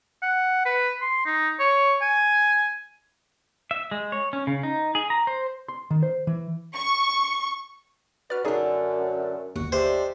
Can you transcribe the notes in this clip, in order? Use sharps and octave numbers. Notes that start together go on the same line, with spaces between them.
F#5
B4
C6
D#4
C#5
G#5
E5
G#3
C#5
C#4
C#3
D#4
G#4
A#5
C5
C6
D#3
C5
E3
C#6
D4 F#4 B4 D5 F6
F#2 D3 A3 D#4 G#4 D5
G1 D#2 F#4
G#3 A3 D4 G4 C5